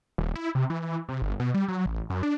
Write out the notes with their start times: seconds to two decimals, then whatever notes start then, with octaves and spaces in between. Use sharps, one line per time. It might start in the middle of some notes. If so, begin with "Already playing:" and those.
0.18 D#1
0.35 E4
0.55 C3
0.70 E3
1.09 C3
1.22 G1
1.40 B2
1.54 G3
1.68 F#3
1.86 A1
2.10 F#2
2.23 D4